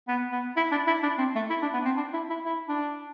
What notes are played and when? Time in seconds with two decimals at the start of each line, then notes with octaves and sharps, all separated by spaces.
0.08 B3
0.32 B3
0.57 E4
0.72 D4
0.87 E4
1.03 D4
1.18 C4
1.35 A3
1.50 E4
1.62 D4
1.74 B3
1.85 C4
1.97 D4
2.13 E4
2.30 E4
2.45 E4
2.68 D4